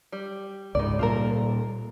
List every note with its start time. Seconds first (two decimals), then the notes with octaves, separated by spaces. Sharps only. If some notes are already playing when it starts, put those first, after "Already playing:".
0.12 G3
0.75 C#2 G#2 D#3 D5
0.99 A#2 G3 F4 A4 A#4